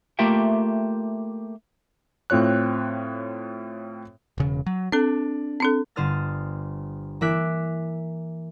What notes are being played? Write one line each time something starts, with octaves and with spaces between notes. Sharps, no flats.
A3 A#3 F4 G4 E5 G5
A2 C4 F4 C#5 F#6
E1 C#3
F#3
C4 D4 A4
C4 D4 A4
G1 D3 C5 D#6 F6 A6
E3 A#3 E5 D6 F#6 B6